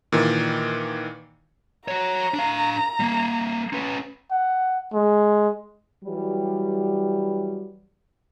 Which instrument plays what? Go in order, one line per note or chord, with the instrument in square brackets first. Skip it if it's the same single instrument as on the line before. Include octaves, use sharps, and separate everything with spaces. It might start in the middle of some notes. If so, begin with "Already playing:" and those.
[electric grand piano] A#2 D#3 E3
[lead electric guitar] F#4 C#5 [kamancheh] A#5
[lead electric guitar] D4 F5
G3 A#3
C#4 B4
[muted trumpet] F#5
G#3
[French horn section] E3 F#3 G3